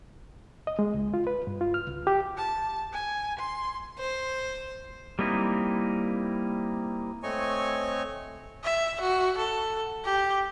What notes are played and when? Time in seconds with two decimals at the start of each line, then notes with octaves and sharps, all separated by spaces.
0.67 D#5
0.79 G#3
0.94 C#2
1.14 F4
1.27 B4
1.47 G2
1.61 F4
1.74 F6
1.87 C#2
2.07 G4
2.37 A5
2.93 G#5
3.39 C6
3.98 C5
5.19 G3 A#3 C4 D#4 E4
7.23 A3 C4 C#5 D#5 G#5 C#6
8.64 E5
9.01 F#4
9.37 A4
10.05 G4